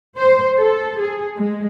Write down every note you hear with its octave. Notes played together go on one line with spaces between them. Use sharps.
C5
A4
G#4
G#3